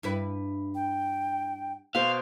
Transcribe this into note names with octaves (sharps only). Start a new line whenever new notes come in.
G2 E4 B4
G5
B2 C5 F5